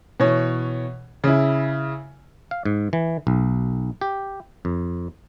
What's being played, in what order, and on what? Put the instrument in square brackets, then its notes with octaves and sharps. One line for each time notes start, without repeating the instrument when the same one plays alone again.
[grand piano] B2 E3 C#5
C#3 E4
[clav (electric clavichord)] F5
G#2
E3
B1
G4
F2